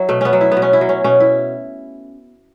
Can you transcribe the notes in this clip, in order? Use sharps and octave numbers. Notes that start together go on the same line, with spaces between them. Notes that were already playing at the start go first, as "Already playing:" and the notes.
Already playing: F#3 E4
B2 A3
B3 C#4
F#3
E4
B3
B2
C#4
E4
F#3
C#4
B2 C#4
E4